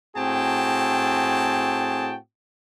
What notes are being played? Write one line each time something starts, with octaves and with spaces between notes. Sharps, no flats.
A2 C4 F#4 G#4 G5 A5